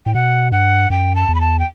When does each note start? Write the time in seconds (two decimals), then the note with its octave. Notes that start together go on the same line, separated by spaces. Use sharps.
0.06 A2 G5
0.15 B2 F#5
0.52 G2 F#5
0.90 F#2 G5
1.16 A5
1.29 E2
1.35 B5
1.41 A5
1.59 G5